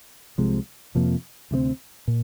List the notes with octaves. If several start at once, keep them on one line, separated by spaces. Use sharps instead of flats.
C2 C3 F3 G#3
F2 C3 F3 A#3
D2 C3 G3 C4
A#2